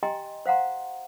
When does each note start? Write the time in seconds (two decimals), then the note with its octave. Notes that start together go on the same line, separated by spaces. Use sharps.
0.03 G4 D#5 G5 G#5 A#5 C6
0.46 C5 F5 F#5 A#5 C6